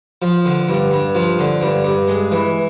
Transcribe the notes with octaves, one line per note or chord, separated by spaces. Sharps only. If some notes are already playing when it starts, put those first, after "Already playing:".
F3
D3
G2
G2
F3
D3
G2
G2
G#3
E3